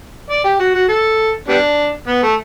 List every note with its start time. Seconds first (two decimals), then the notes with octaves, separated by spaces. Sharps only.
0.30 D5
0.44 G4
0.60 F#4
0.74 F#4
0.89 A4
1.49 G3 B3 D4
2.08 B3
2.23 A3